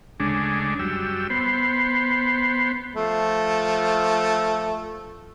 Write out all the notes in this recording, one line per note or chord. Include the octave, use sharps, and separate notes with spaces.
D2 C#3 G#3 D4
F#2 G3 E6
B3 C5
F3 A3